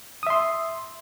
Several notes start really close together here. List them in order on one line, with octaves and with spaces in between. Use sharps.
D#6 E5 C6